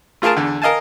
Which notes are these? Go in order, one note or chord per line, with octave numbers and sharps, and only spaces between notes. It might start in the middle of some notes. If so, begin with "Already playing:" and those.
A3 F4 G#4 A#4 A5
E2 D3
A#4 D#5 F5 G#5 A5